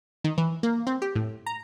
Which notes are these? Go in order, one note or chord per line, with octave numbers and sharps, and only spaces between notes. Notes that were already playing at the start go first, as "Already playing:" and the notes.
D#3
E3
A#3
C4
G4
A2
A#5